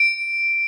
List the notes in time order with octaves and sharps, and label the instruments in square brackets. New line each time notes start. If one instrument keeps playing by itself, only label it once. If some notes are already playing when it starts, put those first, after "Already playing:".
Already playing: [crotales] D7